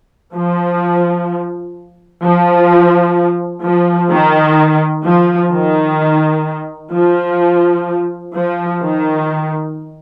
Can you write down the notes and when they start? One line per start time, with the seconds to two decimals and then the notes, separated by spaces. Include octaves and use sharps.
0.34 F3
2.23 F3
3.64 F3
4.11 D#3
5.05 F3
5.52 D#3
6.94 F3
8.35 F3
8.82 D#3